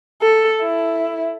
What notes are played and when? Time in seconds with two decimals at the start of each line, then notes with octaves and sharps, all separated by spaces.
0.22 A4
0.62 E4